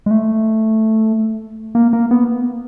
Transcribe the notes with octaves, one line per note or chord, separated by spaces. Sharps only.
G#3
A3
A#3
A#3
B3